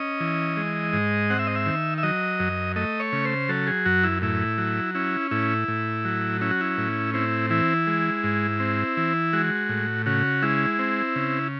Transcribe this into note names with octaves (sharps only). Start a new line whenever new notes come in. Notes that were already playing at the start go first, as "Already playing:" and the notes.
Already playing: C#4 D#5
E3
G#3
G#2
C4 F#5
E5
D#5
E5
D#3
E5
F#3 D#5
F#2
A3 D#5
C#5
C#3
C5
F#3 A4
G#4
F#2 F#4
E4
A2 E4
F#3
C#4 E4
A2 E4
A2
F#3
C#4 E4
F#4
E4
A2
C4 E4
E3 E4
G#3
G#2
C4
E3
G#3 F#4
A2
C#3 F#4
G#3 E4
C4
C#3